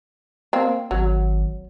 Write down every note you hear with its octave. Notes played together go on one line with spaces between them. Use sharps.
A#3 C4
G#1 F#3